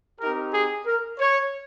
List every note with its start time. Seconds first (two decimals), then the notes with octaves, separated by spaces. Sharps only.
0.20 C4 D#4 G4 A#4
0.53 G#4
0.86 A#4
1.19 C#5